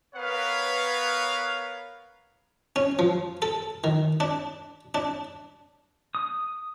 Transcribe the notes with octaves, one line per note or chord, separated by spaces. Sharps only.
B3 A#4 B4 C#5 F5
C#4
F3
A4
D#3
D4
D4
D#6